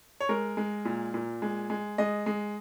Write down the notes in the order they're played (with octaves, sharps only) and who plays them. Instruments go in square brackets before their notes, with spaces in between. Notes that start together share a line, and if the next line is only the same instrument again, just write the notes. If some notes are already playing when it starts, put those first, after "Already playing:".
[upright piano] C#5
G#3 A#4
G#3
A#2
A#2
G#3
G#3
G#3 D#5
G#3